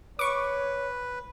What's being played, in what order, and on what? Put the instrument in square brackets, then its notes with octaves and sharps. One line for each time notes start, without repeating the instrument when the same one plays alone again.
[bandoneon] B4 [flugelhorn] C#5 [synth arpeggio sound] C#6 D6